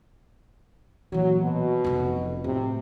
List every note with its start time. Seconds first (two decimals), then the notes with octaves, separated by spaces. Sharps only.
1.12 A#2 E3 F#3
1.42 B2
1.84 F1 F2
2.44 A2 C3